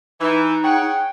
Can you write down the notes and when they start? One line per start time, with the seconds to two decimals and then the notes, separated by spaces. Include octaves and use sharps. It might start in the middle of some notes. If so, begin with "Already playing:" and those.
0.21 E3 D#4
0.64 G#4 C#5 F#5 G5